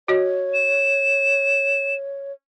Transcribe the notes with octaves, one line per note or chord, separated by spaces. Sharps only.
F#4 C#5 D#5
E7